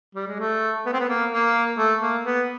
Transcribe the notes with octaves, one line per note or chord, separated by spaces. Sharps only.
G3
G#3
A3
B3
C4
B3
A#3
A#3
A3
A#3
B3